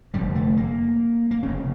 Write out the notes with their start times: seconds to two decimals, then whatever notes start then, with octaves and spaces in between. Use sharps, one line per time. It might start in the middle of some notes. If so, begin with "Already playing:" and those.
0.14 F1 F2 D3 G3
0.35 A3
0.57 A#3
1.31 A#3
1.43 F1 F2 C#3 C#4